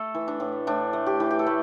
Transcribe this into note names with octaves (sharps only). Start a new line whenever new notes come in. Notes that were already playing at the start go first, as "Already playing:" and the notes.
Already playing: A3 A4
E3
D4
A2
A2 D4
A3
G4
E3
G4
A4
A3 B4